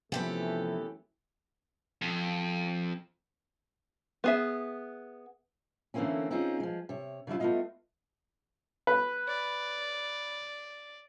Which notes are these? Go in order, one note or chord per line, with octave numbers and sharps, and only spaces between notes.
F#2 C3 E3 F3 A3 B3 G4 A4
F2
B3 G#4 E5
D3 E3 A3 A#3 C4 C#4
C4 C#4 D#4 F4 G#4
F3 G#3
C3 C#5
C#3 G3 D4 E4 F4
A3 B3 C#4 E4 F4 D#5
B4
D5